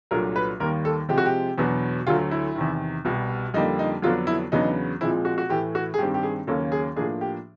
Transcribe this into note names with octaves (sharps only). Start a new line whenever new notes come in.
C2 A#2 F#3 A3 D4 A#4
B4
D#2 D#3 G3 A#3 A#4
A4
C3 F3 G#3 C4 G4
F#4
G4
E2 B2 F#3 B3 D4
D2 D3 F#3 A3 F4
E4
E2 C3 D#3
C2 B2 G3
F2 D3 G3 A#3 D#4
D#4
F2 D3 F#3 B3 D4 F4
E4
E2 C#3 F#3 B3 D4 D#4
A#2 F3 G#3 C4 E4
F#4
F#4
A2 E3 A3 G4
F#4
G#4
G2 D#3 G3 C4 G4
G4
G#4
D#2 C#3 F#3 A#3 C#4 A4
G#4
A2 F3 A#3 D4 G#4
G4